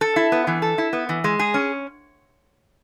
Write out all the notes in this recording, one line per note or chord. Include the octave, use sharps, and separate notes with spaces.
A4
E4
B3
E3
A4
E4
B3
E3
G#3
G#4
C#4